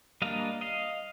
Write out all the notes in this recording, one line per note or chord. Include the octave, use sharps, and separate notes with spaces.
G3 A#3 D4 D#5 F5
D#5 F5